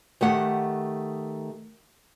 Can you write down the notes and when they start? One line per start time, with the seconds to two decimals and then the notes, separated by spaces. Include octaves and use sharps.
0.21 D#3 A3 G4 F#5